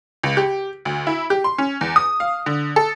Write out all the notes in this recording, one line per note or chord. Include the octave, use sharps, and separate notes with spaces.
C#2
G4
D2
E4
G4
C6
C#4
E2
D#6
F5
D3
A4